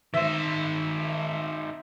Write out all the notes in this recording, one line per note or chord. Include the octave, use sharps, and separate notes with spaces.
D#3 C5 E5